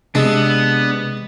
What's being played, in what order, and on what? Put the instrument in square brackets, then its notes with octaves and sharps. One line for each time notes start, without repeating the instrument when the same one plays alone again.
[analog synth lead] C3 [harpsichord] G#3 [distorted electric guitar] B3 [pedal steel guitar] D4 E6